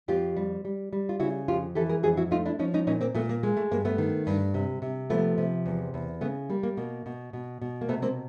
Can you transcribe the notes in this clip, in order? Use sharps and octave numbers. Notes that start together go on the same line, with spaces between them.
F2 F4 G4
G3
G3
G3
F4
C#3 E4 F#4
F2 F4 G4
E3 G4 A4
G#4 A#4
F2 F#4 G#4
E4 F#4
A3 D#4 F4
D4 E4
F3 C#4 D#4
C#4 D#4
A#2 C#4 D#4
A#3 C4
A#2 A3 B3
A#3
G#3 A#3
A3
G2 A#3
A3 B3
D#3
G2
C3
C3
F3 A3 B3
C3
E2
E2
C#3 A3 B3
G3 A#3
A#3
B2 A#3
B2
B2
B2
A#3
C3 A3 B3
A#3 C4